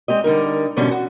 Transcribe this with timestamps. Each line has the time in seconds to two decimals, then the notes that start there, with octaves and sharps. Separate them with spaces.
0.08 G#3 C4 G4 D#5
0.24 D3 G3 D#4 A#4
0.76 E2 G#2 B2 D3 G3 C#4
0.91 F#4